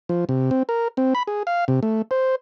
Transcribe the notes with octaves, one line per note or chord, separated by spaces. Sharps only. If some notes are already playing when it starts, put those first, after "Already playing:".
F3
C3
C4
A#4
C4
B5
G#4
F5
C3
A3
C5